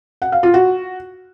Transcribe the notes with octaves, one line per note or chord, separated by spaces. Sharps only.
F#5
F5
F4
F#4